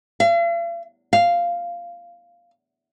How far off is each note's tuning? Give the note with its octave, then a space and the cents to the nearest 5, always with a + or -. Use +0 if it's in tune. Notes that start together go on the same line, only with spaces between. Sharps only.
F5 -45
F5 -5